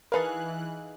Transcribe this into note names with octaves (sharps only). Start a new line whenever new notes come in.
E3 D#4 G#4 A#4 B4 F5 A5 F#6